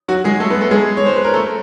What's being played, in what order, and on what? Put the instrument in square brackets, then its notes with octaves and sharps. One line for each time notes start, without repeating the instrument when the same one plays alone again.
[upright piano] F#3 F#4
G#3 G#4
A3 A4
B3 B4
A3 A4
G#3 G#4
C#5
C5
B4
A#4
A3 A4